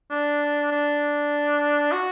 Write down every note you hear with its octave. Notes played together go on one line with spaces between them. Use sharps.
D4
D4
F#4